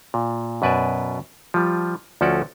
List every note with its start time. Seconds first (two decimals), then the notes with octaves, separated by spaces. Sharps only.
0.14 A#2
0.62 F#2 B2 B4 D5 G#5 A5
1.54 F3 G3
2.21 D2 F3 C#4 F#4 A4 D5